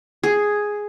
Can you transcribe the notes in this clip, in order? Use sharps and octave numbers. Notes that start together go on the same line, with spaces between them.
G#4